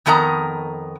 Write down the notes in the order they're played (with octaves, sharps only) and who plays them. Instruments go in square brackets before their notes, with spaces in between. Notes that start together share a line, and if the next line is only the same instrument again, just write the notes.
[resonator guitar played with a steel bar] F2 D#3 B3 A#4 A5 A#5